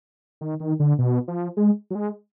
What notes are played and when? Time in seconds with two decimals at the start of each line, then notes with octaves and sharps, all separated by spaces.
0.41 D#3
0.60 D#3
0.80 D3
0.99 B2
1.28 F3
1.57 G#3
1.91 F#3
1.95 G#3